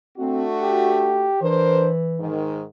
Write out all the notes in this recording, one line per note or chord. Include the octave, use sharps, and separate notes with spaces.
A3 C4 D4 F#4
G4
E3 D4 A#4 C5
G#2 D#3